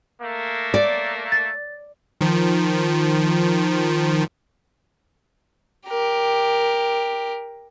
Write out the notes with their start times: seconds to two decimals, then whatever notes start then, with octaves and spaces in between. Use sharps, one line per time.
0.21 A3 A#3
0.74 D5
1.32 A6
2.21 D#3 F3
5.88 G4 A#4